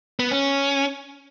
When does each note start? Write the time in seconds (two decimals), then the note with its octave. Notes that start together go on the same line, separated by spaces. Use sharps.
0.19 B3
0.31 C#4